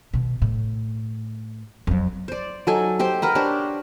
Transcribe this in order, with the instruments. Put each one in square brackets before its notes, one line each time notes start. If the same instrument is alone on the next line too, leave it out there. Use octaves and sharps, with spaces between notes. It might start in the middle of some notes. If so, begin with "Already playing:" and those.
[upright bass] B2 D#3
A2
F2 F#3
[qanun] C5 D5
F#3 D#4 A4 G#5
G4 C5 G5
A#4 B4 F#5
D4 G4 C5 C#5